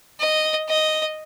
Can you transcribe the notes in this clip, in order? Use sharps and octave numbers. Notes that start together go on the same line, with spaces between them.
D#5
D#5